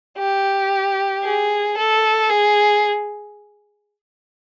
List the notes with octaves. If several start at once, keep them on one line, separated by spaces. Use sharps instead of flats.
G4
G#4
A4
G#4